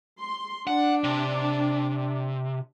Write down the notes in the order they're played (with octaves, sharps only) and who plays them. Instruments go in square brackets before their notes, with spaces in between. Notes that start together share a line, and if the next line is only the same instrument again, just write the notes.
[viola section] C6
[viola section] D4 [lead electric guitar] F#5
[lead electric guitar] C3